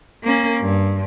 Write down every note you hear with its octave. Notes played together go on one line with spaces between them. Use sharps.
A#3 C#4
G2